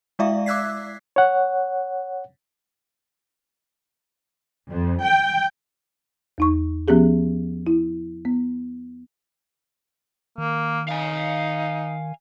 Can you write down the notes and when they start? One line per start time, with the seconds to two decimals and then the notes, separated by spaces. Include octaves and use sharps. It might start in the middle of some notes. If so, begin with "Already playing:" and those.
0.19 G#3 E4 D5 E5 F5
0.46 D6 E6 F#6 G#6 B6 C7
1.16 C#5 F#5
4.71 F2
5.03 G5
6.38 E2 D#4 C#6
6.88 F3 B3 C#4 G4 G#4
7.67 E4
8.25 B3
10.38 D#3 A#3
10.88 D#4 F5 G#5